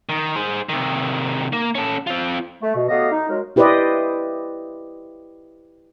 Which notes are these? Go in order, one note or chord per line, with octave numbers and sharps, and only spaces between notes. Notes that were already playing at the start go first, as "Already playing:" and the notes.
D#3
G#4 C5
C3 D#3
A#3
C#4 A4
C4 F4
A3
B2
F#3 A3 B3 G4 D#5 F5
D#4
F#3 G#3 A#4
E4 G4 B4 C5 D5 D#5